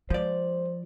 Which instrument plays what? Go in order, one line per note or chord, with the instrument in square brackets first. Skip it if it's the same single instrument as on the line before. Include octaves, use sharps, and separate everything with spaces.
[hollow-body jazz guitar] F3 D5 [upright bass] G#3 [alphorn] C5